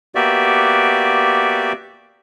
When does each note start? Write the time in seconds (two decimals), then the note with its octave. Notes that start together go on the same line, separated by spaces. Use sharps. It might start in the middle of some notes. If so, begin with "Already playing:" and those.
0.15 A#3 B3 F#4 G4 D5 E5